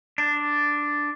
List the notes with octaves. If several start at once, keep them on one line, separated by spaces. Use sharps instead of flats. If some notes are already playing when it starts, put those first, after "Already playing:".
D4